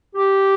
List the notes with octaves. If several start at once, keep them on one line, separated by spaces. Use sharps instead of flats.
G4